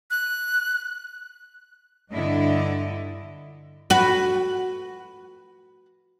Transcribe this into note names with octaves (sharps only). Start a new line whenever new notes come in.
F#6
G2 D3 E4 D#5
F#4 B4